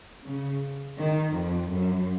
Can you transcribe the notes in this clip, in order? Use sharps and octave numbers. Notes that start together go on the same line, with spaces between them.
C#3
D#3
F2
F#2